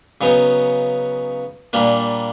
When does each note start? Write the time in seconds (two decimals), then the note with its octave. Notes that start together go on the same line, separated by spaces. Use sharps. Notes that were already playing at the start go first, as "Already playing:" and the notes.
0.21 C#3 F#3 B3 D#4
1.73 A#2 G3 A#3 D4